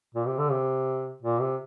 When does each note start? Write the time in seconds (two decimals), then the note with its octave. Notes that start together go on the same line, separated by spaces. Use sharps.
0.15 A#2
0.27 C3
0.38 D3
0.51 C3
1.22 A#2
1.40 C3